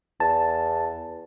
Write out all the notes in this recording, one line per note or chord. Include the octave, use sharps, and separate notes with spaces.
E2 A5